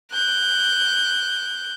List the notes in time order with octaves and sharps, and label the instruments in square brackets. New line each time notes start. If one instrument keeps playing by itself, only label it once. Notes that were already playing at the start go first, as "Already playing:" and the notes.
[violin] F#6 G6